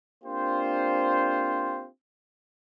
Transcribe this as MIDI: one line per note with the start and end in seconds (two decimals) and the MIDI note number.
0.24 1.87 58
0.24 1.87 60
0.24 1.87 62
0.24 1.87 65
0.24 1.87 67
0.24 1.87 72